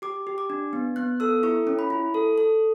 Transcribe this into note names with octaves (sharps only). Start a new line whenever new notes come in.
G4 D6
G4
D6
D4
B3
B3 F#6
A4 E6
E4 C#6
C#4
B5
E4
A4
A4